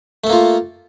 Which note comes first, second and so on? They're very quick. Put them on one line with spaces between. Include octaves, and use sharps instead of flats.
A3 A4 A#3 F4